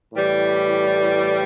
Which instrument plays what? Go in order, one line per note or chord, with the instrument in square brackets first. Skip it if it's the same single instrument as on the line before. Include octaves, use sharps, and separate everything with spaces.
[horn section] A2 E3 G3